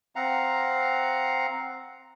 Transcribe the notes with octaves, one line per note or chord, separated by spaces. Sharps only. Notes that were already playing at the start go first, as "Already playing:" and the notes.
C4 F5 F#5 A#5